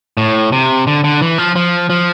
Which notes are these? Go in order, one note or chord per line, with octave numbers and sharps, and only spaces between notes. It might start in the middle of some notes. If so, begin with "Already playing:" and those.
A2
C3
D3
D3
E3
F3
F3
F3